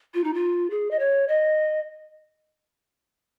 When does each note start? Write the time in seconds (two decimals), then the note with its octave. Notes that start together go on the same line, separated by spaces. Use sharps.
0.14 F4
0.24 D#4
0.34 F4
0.71 G#4
0.91 D#5
0.99 C#5
1.28 D#5